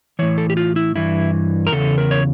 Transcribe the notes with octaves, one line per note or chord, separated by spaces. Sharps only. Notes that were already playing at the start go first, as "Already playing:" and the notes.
A2 E3 C#5
A4
G4
F4
E4
G2 E3 E4
A#4
E2 C#3 A4
A#4
C#5